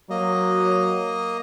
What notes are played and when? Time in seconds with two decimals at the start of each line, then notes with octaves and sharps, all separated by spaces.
0.10 F#3 A#3 D#5